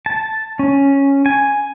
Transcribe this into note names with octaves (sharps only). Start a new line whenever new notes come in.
A5
C#4
G#5